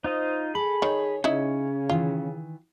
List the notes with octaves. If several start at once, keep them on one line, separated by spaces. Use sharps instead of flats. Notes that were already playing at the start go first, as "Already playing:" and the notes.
D#4 F4 C5 D#5
G#4 A4 B5
D#3 C#5
C#3 C#4 D#4 E4
D#3 E3 F4